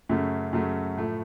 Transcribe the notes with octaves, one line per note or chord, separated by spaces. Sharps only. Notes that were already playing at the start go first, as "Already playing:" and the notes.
F#2 C#3 F#3 A3
F#2 C#3 F#3 A3
A2 F3 A3